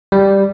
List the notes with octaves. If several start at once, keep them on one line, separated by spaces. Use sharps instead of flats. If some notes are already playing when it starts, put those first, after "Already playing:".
G3